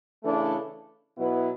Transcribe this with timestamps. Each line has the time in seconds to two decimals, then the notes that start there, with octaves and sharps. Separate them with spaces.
0.24 C#3 E3 A3 D4 A4
1.17 B2 F#3 B3 E4 B4